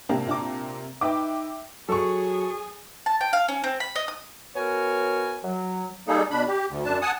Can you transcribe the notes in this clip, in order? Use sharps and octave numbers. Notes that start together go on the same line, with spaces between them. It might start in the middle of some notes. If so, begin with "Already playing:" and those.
C3 A#3 D4 G4
A#2 D4 D6
D#4 B4 E5 G5 D6
F#3 G#4 A4 C#6
A5
G5
F5
C#4
C4
B5
D#5
D#6
B3 F#4 A#4 C#5 G#5
F#3
G3 A#3 D#4 G#4 A4
B2 D4 B5
G4
D2
F#2 D4 A5
F#5 G#5 A5 D#6